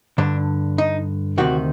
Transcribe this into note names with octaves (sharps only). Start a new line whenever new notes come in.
G2 D3 D4
D#4
D2 C3 D#3 F#4